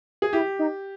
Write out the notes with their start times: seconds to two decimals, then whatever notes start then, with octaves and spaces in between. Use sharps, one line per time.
0.22 G#4
0.33 E4 G4
0.59 D#4